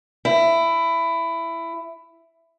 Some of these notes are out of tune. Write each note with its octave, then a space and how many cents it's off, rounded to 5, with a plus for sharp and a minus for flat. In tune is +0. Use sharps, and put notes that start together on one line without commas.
E4 +15